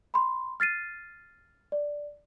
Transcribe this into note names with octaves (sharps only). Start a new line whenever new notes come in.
B5 C6
F6 A6 C7 D#7
D5